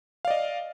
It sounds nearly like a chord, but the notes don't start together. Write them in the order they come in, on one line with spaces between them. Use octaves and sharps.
F5 D5 D#5